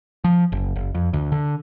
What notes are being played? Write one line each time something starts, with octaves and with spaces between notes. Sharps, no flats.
F3
F#1
F#1
F2
D2
D3